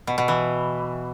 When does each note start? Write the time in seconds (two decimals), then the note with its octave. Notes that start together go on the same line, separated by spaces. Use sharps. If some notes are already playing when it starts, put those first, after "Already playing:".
0.07 B2
0.18 B2
0.28 E3